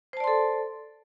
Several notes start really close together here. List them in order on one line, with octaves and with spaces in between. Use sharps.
C5 A5 D5 C6 A4